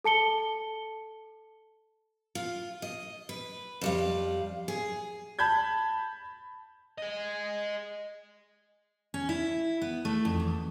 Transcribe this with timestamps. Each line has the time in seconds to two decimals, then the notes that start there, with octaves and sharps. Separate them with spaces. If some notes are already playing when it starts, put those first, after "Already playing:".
0.04 A4 A5 C#7 G7
2.35 F4
2.82 D#5
3.29 B4
3.81 F2 G3 F5
4.68 G#4
5.39 A5 B5 G6 G#6
6.98 G#4 D#5
9.14 C#4
9.29 E4
9.81 B3
10.05 A3
10.25 F2
10.40 E2